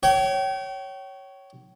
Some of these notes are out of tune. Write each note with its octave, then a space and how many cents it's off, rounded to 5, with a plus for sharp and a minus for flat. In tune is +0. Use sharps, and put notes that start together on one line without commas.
C#5 +0 G5 -35